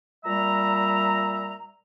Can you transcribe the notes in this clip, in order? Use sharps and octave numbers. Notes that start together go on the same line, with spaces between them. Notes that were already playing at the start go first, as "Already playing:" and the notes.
A#2 G3 E5 A#5